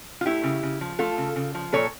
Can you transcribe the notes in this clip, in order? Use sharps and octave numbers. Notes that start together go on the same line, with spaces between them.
F4
A3 E4 G4
C#3
C#3
F3
A3 F4 A4
C#3
C#3
F3
A#2 A4 C#5